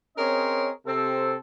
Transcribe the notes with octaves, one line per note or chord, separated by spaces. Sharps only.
C4 C#4 G#4 A#4 C#5 D#5
C3 C4 A4